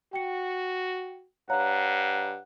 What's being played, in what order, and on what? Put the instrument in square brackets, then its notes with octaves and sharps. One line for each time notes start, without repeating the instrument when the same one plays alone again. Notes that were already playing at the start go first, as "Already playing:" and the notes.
[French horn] F#4 [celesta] G5 C#7
[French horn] G2 [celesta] C#5 F5 A#5 [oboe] F#5